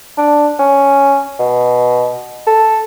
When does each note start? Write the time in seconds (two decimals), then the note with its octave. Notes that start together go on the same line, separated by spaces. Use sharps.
0.18 D4
0.59 C#4
1.40 B2
2.47 A4